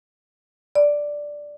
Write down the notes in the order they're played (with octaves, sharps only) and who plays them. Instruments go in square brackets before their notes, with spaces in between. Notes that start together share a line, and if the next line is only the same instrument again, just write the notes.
[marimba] D5